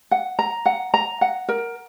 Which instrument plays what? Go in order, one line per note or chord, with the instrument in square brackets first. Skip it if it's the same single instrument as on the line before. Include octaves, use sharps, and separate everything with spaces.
[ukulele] F#5
A#5
F#5
A#5
F#5
A#4